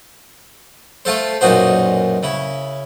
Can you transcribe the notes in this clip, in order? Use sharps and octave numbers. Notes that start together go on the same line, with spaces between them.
A3 F4 A4 C5
B1 F#2 A#2 D#4 F#4 C5
C#3 E4